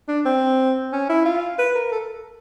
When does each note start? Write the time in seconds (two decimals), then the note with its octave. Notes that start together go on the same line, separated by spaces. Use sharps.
0.08 D4
0.25 C4
0.93 C#4
1.09 E4
1.25 F4
1.59 B4
1.75 A#4
1.92 A4